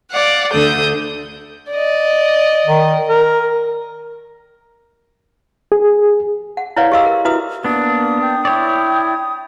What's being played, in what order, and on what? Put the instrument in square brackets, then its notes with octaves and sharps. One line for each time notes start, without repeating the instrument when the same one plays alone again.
[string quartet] D5 F5 F#5
D2 D3 D4 A4 D#6 G6
[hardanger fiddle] D5 D#5
[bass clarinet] D#3
A#4
[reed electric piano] G#4
[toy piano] F#5
E4 B4 C#5 D5 F5 F#5
G4 G#4 D#5 F5 C6 E6
A#4
E4 F#4 B4 E5 D#6
[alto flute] A#3 [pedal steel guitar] B3 D4 [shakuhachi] D#6
[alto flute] G5
[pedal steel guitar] E4 C#5 D5 [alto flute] G5